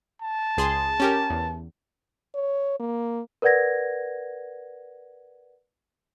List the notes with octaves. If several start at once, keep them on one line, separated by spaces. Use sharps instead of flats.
A5
C#2 G#4 C6
C#4 G4 A#4
E2
C#5
A#3
A#4 B4 D5 F#5 G#6 A#6